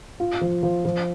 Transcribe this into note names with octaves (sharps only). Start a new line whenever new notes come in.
F4
F3
F3
F3